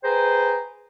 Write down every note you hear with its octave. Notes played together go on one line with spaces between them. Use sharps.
G#4 B4 C5 G5 A#5